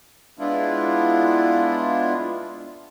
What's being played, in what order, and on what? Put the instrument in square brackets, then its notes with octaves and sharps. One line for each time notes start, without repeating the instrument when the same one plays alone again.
[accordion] G#3 B3 D4 E4 F4